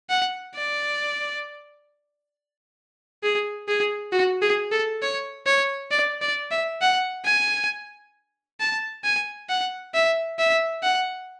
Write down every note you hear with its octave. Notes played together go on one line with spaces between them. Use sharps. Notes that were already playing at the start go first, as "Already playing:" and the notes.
F#5
D5
G#4
G#4
F#4
G#4
A4
C#5
C#5
D5
D5
E5
F#5
G#5
A5
G#5
F#5
E5
E5
F#5